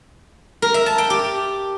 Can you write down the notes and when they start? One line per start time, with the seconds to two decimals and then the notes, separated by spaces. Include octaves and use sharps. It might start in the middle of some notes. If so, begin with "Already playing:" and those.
0.62 A#4
0.74 E5
0.86 A5
0.98 G5
1.10 G4